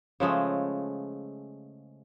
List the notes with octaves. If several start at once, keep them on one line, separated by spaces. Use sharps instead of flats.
C#3 F3 G#3 A3